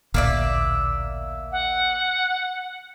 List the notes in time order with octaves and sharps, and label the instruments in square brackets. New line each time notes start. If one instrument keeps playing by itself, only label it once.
[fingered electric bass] A1 D2 A#2 [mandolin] A#3 D5 E5
[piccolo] F#5